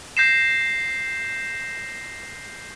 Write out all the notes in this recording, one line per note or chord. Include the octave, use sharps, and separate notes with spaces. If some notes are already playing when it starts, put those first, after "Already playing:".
G6 A#6 C7 E7